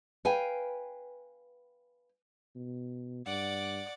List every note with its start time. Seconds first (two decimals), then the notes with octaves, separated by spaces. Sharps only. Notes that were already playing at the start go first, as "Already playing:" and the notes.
0.25 B4 F5 G5 G#5
2.56 B2
3.26 G2 D5 F#5 D6